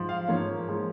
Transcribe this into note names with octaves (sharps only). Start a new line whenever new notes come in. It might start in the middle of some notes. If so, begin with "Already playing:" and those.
Already playing: G#2 F3
F5
G#2 F3 A#3 C#5
F3 G#3